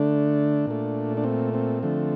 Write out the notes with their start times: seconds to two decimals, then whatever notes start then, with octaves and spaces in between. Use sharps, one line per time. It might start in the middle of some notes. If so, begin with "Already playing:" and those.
Already playing: D3 A3 D4
0.67 A#2 A3
1.17 D4
1.24 C4
1.54 C4
1.83 D3 F3 A3